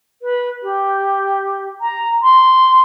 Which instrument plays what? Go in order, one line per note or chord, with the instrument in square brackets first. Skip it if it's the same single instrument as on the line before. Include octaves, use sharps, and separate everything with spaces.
[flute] B4
G4
A#5
C6